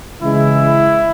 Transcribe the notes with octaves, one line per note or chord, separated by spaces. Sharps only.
C#3 E3 G#3 E4